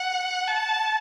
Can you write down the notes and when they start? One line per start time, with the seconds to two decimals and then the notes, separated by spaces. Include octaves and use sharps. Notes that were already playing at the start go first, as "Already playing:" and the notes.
Already playing: F#5
0.47 A5